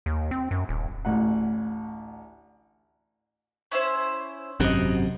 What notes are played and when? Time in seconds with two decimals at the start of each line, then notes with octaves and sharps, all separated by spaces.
0.06 D#2
0.31 C4
0.51 F#2
0.69 D#1
1.05 A1 D2 F#5
3.72 C#4 E4 C5
4.60 G#1 F#2 C3 F#4 D#5